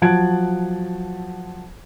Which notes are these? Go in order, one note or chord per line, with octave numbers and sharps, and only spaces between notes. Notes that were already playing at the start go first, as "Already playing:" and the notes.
F3 F#3 F#5 A5 G#6 D7